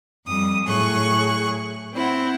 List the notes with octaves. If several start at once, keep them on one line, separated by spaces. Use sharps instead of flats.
F2 G3 D#6
A2 F#3 G#4 C#6 F#6
C4 E4 F#5